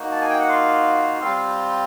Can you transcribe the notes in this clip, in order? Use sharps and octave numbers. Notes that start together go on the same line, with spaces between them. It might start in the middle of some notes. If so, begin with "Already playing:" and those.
Already playing: A#3 D#4 F#4
A5
G#5
G5
F#5
F4 F5
G3 C4 F4